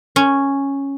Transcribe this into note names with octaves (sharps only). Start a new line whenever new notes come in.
C#4